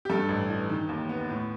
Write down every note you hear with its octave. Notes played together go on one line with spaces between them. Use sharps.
G4
G2 A4
A1
E3
D#3
D#2
B3
A2